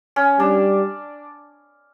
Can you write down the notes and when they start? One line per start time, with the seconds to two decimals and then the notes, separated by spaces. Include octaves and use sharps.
0.16 C#4
0.39 G3 D4